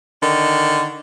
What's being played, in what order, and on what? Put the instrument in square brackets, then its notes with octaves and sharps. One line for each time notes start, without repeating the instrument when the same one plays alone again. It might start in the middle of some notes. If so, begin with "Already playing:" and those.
[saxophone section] D3 D#3